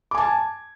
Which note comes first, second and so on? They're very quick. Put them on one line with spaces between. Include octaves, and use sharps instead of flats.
D6 G#5 A5 G#6